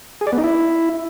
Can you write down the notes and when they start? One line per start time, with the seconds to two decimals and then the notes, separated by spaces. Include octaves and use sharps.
0.21 G#4
0.27 D5
0.32 B3
0.38 D#4
0.44 E4